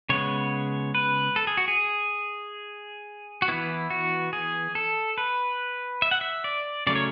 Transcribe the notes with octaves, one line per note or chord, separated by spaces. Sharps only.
C#3 G#3 B3 C#5
B4
A4
G#4
F#4
G#4
F#4
E3 B3 E4
F#4
G#4
A4
B4
E5
F#5
E5
D5
C#3 F#3 A3 C#4 D5
C#5